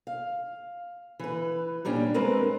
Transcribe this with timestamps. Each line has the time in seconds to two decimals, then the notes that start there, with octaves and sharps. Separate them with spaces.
0.07 F5
1.19 E3 B4
1.85 A#2 G3 C#4 D4
2.14 G#3 C4 A#4 B4